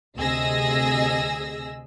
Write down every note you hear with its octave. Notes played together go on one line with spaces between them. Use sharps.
D2 C3 G#4 D#5 E6 A#6